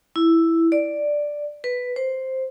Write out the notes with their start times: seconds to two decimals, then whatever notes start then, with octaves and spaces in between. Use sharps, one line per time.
0.16 E4
0.72 D5
1.64 B4
1.96 C5